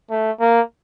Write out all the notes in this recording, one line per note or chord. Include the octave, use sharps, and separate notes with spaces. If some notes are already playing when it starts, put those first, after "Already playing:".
A3
A#3